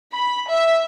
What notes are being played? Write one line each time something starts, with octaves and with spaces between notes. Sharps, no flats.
B5
E5